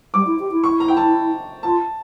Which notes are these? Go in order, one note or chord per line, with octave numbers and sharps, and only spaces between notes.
G3 D6
E4
G4
E4
C#6
A#5
G5
A5
F4 A5